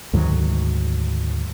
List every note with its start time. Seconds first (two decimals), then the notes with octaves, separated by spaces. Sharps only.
0.13 D2 G#2 D#3 F#3